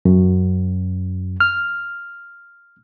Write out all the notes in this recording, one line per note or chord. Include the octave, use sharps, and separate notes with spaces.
F#2
F6